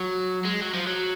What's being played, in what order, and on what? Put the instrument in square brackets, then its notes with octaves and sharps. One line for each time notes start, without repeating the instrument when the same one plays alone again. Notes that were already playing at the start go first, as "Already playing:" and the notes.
Already playing: [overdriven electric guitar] F#3
G#3
F#3
F3
F#3